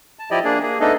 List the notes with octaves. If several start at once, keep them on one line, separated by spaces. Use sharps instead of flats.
A5
F3 E4 G4 D5 D#5
A#3 D4 G#4
A#3 G#4
A3 B3 D4 D#4 A4 D#5